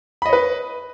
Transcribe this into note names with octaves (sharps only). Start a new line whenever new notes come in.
B4 C#5 D#5 B5